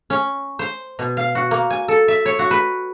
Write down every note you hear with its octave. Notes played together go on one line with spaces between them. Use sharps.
C#4
C5
B2
F5
F#4
A#3
G#5
A4
E5
C#5
F#4
B4